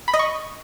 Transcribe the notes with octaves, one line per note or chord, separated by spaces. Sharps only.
B5
D#5
C#6